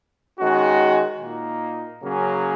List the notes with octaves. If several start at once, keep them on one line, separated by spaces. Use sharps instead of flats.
D#3 G#3 C#4 F#4
A#2 A#3 D#4
C#3 F#3 A#3 C#4 G#4